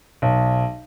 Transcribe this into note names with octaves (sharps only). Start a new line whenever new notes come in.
B1